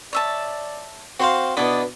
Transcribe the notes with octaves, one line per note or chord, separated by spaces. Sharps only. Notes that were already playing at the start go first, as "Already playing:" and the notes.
C#5 D5 E5 A5
C4 F#4 C5 F5
B2 B3 D4 E4 D5 D#5